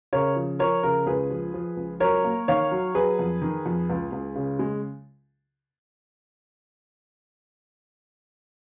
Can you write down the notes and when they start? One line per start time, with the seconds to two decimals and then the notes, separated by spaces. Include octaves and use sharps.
0.13 C#3 A#4 C#5
0.36 F3
0.59 F3 A#4 C#5
0.83 C#3 A#4
1.06 C#2 G#4 B4
1.30 F3
1.54 F3
1.77 C#2
2.00 F#3 A#4 C#5
2.24 A#3
2.48 D#3 C#5 F5
2.71 F#3
2.94 F#3 G#4 B4
3.19 F2
3.41 D#3
3.66 F2
3.90 C#2
4.12 C#2
4.36 C#3
4.59 G#3